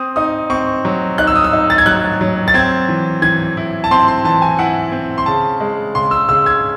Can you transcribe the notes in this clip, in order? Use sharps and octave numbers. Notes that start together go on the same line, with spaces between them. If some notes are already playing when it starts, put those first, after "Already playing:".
Already playing: C4 D#6
D#4 D#6
C4 C#6
F#3
D#4 F#6
E6
D#6
E6
D#4
A6
G#6
F#3 F#6
F#3
A6
C4 G#6
E3
E3 G#6
E4
A5
C4 C6
C6
E3 A5
G#5
E4 F#5
C4
C6
C#3 A5
G#3
C#3 C6
E6
C#3 E6
G#6